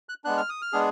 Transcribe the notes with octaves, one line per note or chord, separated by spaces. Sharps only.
F#6
G#3 B3 D4 F#6
F6
D#6
F6
G#3 B3 D4 G#4